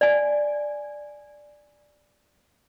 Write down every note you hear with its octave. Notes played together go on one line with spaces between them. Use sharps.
D5 G#5